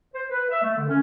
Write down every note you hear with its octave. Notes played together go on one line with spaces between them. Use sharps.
C5
B4
E5
A3
D3
C#4